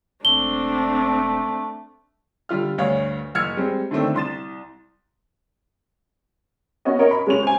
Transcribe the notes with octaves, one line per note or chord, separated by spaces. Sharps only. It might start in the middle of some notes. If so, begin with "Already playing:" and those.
E1 A3 C4 D4 G7
D3 G3 F4 F6
D2 G2 C#5 F5
F#1 E6 F6 G#6 C#7
G3 G#3 C4
D3 D#3 A3 C4 D4
C2 C6 A6 E7
B3 C#4 F#4 D#5
C#4 A#4 C#5 D#5
B5
G#3 C#4 F7
C5 G#5